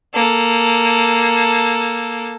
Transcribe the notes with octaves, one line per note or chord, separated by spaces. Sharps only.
A#3 A4